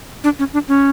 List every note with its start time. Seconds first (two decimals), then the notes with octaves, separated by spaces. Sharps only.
0.24 D4
0.39 C#4
0.53 D4
0.68 C#4